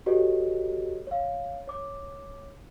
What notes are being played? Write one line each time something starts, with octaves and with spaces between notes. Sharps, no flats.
F#4 G4 A4 B4 C#5 D#5
C#5 F5
C#5 D6